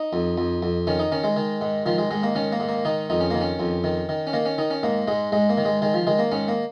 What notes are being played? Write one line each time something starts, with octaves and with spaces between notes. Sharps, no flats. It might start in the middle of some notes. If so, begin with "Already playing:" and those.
Already playing: D#4
F2
F2
F2
D#3 C#4
D#4
D#3 C#4
G#3
D#3
G#2
D#3 F3
G#3
G#2 G#3
A#3
D#3 C#4
A#3
G#2
A#3
D#3 D#4
F2 D#4
C#4
D#3 A#3
C#4
F2
D#3
D#3
C#4
D#3 A#3
C#4
D#3 D#4
C#4
G#2 A#3
G#2 G#3
G#2 G#3
A#3
D#3
G#3
D#3 G#3
F3
D#3 G#3
A#3
G#2 C#4
A#3